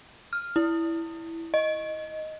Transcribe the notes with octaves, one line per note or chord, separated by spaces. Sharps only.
F6
E4
D#5